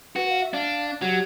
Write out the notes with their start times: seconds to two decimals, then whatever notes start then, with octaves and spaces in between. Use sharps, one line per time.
0.16 F#4 B4
0.29 F5
0.41 E5
0.54 D4 F5
1.02 F#3 G4